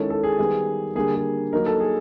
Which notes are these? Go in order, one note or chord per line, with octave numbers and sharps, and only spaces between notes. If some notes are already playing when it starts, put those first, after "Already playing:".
Already playing: D#3 G#3 C#4 E4 A4
A4
G#4
D#3 G3 B3 G#4
D3 G3 A#3 G#4
G#4
F#3 A#3 D#4 A#4
A4
G#4